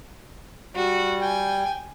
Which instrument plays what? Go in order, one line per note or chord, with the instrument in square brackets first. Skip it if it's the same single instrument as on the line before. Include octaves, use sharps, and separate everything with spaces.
[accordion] G3 [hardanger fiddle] F#4
[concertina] G5 [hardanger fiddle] G#5